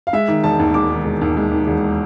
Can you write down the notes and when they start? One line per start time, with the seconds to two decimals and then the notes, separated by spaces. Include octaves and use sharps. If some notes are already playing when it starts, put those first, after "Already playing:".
0.07 F5
0.13 G#3 E5
0.28 D#3
0.43 E1 A5
0.59 D#2
0.74 G#3 D6
0.90 D#3
1.05 E1
1.21 D#2
1.37 G#3
1.52 D#3
1.67 E1